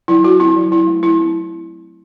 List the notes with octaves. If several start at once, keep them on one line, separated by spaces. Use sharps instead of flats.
F#3 E4
F#3 F#4
C4 E4
F#3
F#3 E4
A3
F#3 E4
C4